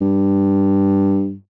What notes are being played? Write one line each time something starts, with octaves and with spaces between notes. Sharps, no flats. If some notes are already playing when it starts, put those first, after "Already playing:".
G2